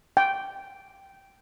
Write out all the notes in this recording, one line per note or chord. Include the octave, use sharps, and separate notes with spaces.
G5